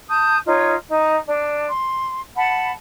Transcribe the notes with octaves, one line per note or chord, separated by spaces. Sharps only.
A5 D#6 G6
D#4 F4 C#5
D#4
D4
C6
F#5 A5 B5